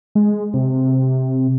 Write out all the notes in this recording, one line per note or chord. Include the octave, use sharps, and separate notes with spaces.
G#3
C3